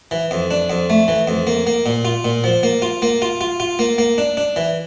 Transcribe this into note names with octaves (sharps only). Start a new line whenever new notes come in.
E3
F2
D4
F2
A3
E3
F2
A#3
A#3
A#2
F4
A#2
F3
A#3
F4
A#3
F4
F4
F4
A#3
A#3
D4
D4
E3